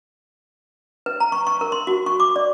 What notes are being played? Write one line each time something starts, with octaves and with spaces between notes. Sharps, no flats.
B4
A#5
C#6
C#6
A#4
C6
F#4
C#6
D6
D5